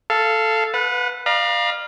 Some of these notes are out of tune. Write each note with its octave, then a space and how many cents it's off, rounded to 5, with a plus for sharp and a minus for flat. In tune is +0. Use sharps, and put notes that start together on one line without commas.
A4 +0 F5 -15
B4 +0 F#5 -40
D5 +45 F5 +0 A#5 +45